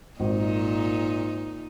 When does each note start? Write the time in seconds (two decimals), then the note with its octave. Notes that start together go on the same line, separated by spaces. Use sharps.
0.20 G#1 A#2 D#4